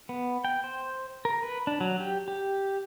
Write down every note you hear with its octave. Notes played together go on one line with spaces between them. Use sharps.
B3
G5
C5
A#4
B4
D4
F#3
G4
G4